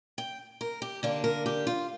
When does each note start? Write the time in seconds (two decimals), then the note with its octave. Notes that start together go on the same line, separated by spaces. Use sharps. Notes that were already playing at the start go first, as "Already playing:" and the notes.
0.18 G5
0.61 A#4
0.82 G4
1.03 D3 A#3 D4 G4
1.24 A#4
1.46 G4
1.67 F4